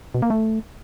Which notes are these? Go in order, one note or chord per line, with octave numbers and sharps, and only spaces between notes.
B2
A#3
A3